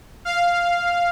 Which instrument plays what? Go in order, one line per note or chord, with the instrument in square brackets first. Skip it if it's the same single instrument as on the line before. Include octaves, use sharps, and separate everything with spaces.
[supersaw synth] F5